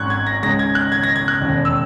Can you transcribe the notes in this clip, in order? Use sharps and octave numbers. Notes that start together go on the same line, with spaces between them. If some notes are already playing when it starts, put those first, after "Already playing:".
Already playing: G#1 G#2 F#3 C#4 C#6 F#6 G#6
G#6
A#6
C#2 C#3 G#3 D#4 A#6
G#6
F#6
G#6
A#6
G#6
F#6
E1 D#2 C#3
E6